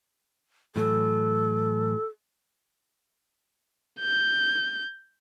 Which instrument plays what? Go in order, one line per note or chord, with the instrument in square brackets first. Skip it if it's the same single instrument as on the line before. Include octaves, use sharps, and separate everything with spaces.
[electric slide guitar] A2 E3 F#3 [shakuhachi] A4
[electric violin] G6